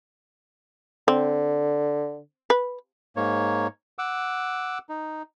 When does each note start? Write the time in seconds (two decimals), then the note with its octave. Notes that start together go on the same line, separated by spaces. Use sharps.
1.08 D3 C4
2.50 B4
3.16 G#2 A#3 C#5
3.99 F#5 D6 E6
4.89 D#4